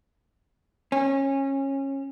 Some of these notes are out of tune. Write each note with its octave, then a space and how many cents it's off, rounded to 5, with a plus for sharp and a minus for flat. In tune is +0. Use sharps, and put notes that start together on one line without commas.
C#4 -20